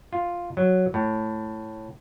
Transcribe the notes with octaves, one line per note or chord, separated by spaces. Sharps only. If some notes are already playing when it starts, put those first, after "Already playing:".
F4
F#3
A2